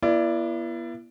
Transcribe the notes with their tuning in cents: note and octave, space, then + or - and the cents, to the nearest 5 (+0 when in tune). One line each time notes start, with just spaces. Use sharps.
B3 -35 E4 +35 D5 +0